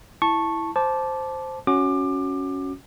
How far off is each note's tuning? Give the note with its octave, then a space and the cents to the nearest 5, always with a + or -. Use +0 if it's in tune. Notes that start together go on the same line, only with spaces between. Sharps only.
E4 +0 A5 +0 C#6 -10
C5 +0 A5 -15 D6 +0
C#4 +0 F#4 +0 D6 +25